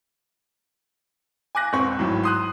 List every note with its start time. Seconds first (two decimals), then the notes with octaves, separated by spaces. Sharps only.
1.55 G#5 D6 F#6 A#6
1.73 E1 C4 B4 C#6
1.99 G#1 A2 F#3
2.23 C6 D#6 F#6